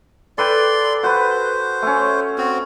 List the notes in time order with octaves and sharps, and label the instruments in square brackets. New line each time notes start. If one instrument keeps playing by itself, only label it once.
[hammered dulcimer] A4 B4 G5 [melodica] D5 C6
[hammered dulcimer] F#4 B4 [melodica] C5
[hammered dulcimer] A3 C#4
[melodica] C4 F#4